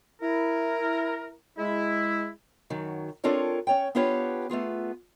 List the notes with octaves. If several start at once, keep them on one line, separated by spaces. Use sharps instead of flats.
E4 A#4
G#3 E4
F#2 D#3 F#3
C4 D4 F4 A4 A#4 C#5
C#4 C#5 G5
B3 D4 F4 G4 B4 C#5
A3 B3 F4 G#4